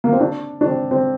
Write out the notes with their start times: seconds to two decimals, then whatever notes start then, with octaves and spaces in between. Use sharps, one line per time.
0.04 A#3
0.12 C4
0.20 D4
0.61 D4
0.67 C4
0.91 C4